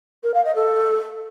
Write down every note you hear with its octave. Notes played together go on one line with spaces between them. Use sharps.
A#4
F5
D#5
A4